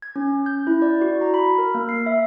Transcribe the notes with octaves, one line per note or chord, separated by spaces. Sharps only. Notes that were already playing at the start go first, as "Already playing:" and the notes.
G#6
C#4
G6
E4
D5
F#4
A#5
B5
A#4
A#3
C7
E5